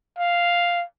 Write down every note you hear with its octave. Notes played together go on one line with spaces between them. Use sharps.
F5